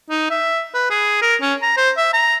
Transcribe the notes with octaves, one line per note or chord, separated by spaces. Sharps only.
D#4
E5
B4
G#4
A#4
C#4
A#5
C5
E5
A#5